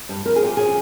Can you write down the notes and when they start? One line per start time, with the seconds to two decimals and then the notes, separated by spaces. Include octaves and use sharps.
0.09 G2
0.26 F2 A#4
0.36 G#4
0.42 F3 G4
0.57 C#3 G#4